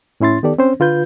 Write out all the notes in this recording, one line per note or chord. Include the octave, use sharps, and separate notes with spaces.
A2 C#4 E4 C6 A6
D#3 B3 G4 A4 D5
C4 C#4 C5
D3 F4 B4 G6